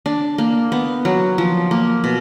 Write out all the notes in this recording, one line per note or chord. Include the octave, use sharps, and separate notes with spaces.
D4
A#3
B3
F#3
F3
A#3
B2